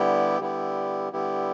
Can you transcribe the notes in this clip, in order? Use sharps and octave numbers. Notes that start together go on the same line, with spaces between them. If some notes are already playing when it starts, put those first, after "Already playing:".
Already playing: D3 G3 B3 E4 G4
D3 G3 B3 E4 G4
D3 G3 B3 E4 G4